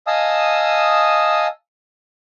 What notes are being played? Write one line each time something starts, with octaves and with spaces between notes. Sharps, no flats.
D#5 F5 G#5 A5 D#6 E6